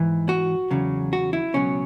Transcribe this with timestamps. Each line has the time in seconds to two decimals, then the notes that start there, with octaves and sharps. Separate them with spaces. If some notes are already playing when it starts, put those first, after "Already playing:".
Already playing: G#2 E3
0.29 F#4
0.71 E2 C#3 F#3
1.13 F#4
1.33 E4
1.54 C#2 B2 F#3 C#4